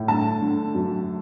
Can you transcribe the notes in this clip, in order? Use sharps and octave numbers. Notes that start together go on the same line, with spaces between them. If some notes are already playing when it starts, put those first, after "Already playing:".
Already playing: A2
D3 A5
D3
F#2